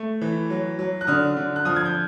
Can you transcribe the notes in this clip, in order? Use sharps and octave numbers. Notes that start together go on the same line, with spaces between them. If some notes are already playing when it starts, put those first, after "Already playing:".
Already playing: A3
E3
F#3
F#3
F#6
D3 D#6 F6
D3
F#6
F3 D#6 F6
G#6
G6